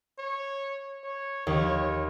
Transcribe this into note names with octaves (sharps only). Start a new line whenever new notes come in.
C#5
C#5
D#2 C#5